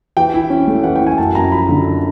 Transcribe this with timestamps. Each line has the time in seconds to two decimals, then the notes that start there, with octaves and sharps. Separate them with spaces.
0.17 E3 G5
0.34 E4
0.50 C#4
0.67 A3
0.84 E3 F#5
0.96 G5
1.02 E4 G#5
1.18 F#2 A5
1.35 F#2 A#5
1.52 F3 B5
1.69 D3